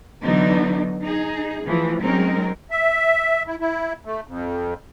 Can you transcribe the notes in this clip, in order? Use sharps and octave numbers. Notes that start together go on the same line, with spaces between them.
D3 E3 F#3 B3 D4 D#4
D#4 G#4
E3 F3 A3
F#3 G#3 C4 C#4 D#4 A#4
E5
E4
E4
A3
F2